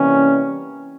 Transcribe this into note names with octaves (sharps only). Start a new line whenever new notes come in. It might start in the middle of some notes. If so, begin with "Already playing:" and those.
Already playing: C3 E3 G3 A#3 C#4